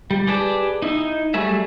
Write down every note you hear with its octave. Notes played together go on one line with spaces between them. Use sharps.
G3
G4 G#4 B4 D5 A5
D#4 E4
F#3 G3 A3 G#4 E5